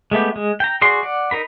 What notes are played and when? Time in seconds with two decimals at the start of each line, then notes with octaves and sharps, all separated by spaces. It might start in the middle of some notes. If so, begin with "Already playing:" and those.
0.11 G#3 A3 B3 G4
0.36 G#3
0.60 G5 A#5
0.82 F#4 G#4 D5 C6
1.03 D5 F#5
1.31 D#4 A#4 B5